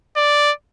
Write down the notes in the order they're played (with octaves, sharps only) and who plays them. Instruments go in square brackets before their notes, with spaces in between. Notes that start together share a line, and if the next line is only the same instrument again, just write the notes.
[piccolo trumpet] D5